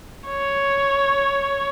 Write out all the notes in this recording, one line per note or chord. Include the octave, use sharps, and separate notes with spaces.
C#5